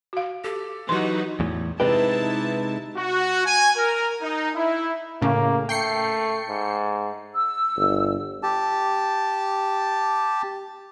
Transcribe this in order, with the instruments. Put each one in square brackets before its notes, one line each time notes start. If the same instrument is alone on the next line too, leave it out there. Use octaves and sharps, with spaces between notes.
[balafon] F#4 F5
[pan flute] G4 [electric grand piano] A4
[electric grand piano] E3 F#3 [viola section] D#4 F#4 B4 [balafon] C6
[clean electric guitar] E2 A2
[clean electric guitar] C3 G#3 G4 [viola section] D#4 E4 A5 [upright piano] B4
[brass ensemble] F#4
G#5
A#4
D#4
E4
[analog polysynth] A2 C#3 [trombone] A#3
[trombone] A3 [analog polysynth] G5 C7 C#7
[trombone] G#2
[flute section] E6
[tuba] G1
[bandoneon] G4 A5